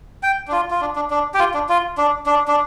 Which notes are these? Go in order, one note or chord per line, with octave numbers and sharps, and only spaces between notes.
G5
D4
F4
F4
D4
D4
D4
G4
F4
D4
F4
D4
D4
D4